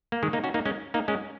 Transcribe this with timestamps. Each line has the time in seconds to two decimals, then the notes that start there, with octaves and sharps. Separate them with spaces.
0.12 A#3
0.23 D#3 G#3
0.33 A#3 D#4
0.44 C#4 F#4
0.54 A#3 D#4
0.65 G#3 C#4
0.94 A#3 D#4
1.08 G#3 C#4